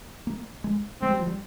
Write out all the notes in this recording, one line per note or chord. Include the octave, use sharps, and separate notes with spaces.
A#3
G#3
G#3 C4
G3
F3
G3